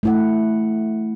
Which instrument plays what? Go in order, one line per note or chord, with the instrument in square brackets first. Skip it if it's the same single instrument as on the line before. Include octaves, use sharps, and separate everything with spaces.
[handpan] A3 E4 F#5